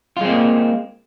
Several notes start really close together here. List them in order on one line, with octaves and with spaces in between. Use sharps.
F4 G#3 C4 A#3